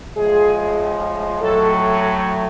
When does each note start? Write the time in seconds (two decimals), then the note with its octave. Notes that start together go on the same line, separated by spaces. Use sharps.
0.16 A2 F3 G#3 G#4
1.40 A2 F#3 A3 A4